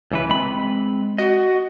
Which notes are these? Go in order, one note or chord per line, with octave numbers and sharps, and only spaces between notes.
C#2 E3 B4
G#3 C4 B5
F#4 D#5